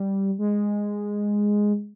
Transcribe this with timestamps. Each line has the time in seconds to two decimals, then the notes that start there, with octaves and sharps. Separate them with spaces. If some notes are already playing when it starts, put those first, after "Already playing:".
Already playing: G3
0.39 G#3